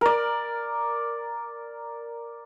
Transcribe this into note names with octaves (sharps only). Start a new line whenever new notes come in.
A#4 D5